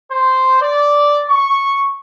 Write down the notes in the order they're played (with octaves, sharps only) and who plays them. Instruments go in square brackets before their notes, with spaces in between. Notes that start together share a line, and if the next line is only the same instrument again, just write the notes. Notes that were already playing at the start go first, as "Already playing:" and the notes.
[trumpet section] C5
D5
C#6